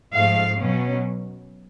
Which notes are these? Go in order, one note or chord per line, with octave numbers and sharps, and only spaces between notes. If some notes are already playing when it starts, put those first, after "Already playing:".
G#2 F3 A3 F5
B2 F#3 C#4